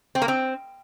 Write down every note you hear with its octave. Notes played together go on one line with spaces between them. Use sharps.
C4
A#3
C4